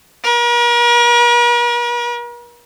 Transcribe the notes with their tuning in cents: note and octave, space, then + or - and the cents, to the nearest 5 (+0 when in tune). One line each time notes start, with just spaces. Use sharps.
A#4 +45